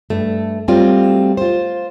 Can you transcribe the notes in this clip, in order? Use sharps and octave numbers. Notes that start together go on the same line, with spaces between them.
G2 A3
F#3 G3 A3 C4 F4
F4 C5